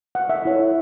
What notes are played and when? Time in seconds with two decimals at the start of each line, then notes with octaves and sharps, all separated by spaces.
0.15 F#5
0.29 E5
0.45 E4 A4 C#5